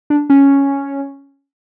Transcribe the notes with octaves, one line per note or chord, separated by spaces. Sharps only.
D4
C#4